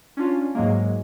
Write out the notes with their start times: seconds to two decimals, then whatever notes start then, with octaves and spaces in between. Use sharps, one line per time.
0.17 C#4 D4 F4
0.55 G#2 F#3 G#3 A#3